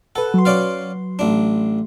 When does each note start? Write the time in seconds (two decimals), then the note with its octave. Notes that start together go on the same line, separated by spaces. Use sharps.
0.16 A4 B4 F#5
0.34 F#3 C6
0.45 C#4 D5 F5
1.19 A1 D4